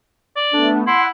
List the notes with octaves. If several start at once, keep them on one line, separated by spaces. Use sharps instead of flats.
D5
A3 B3 D4
E4 F#5 C6